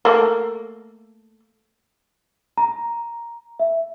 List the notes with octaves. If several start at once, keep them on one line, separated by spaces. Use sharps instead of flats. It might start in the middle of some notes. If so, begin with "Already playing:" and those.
A3 A#3
A#5
E5